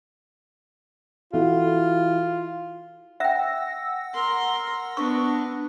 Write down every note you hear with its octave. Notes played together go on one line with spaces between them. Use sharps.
E3 F4 F#4 A4
E5 F#5 G5 E6 A#6
A#4 C6
B3 D4 C#6